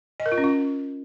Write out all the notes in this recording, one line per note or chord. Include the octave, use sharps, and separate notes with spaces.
D#5
A#4
F4
C#4
F4